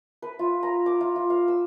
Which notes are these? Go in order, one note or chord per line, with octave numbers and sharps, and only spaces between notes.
B4
F4
A#5
D6
F4
F4
F5
E6